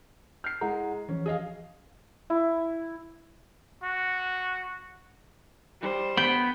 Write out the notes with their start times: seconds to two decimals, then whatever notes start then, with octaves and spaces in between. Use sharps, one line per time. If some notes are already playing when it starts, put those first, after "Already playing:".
0.44 F6 G6 C7
0.61 G#3 E4 F#5 A#5
1.09 E3 F3 C#4
1.26 G#4 D#5 F5
2.30 E4
3.84 F#4
5.81 G3 C5
6.17 B3 G5 B5